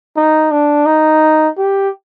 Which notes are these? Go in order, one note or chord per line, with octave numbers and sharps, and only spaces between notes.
D#4
D4
D#4
G4